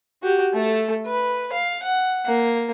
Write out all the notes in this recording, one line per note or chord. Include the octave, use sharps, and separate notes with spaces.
F#4 G4
A3 A4
B4
F5
F#5
A#3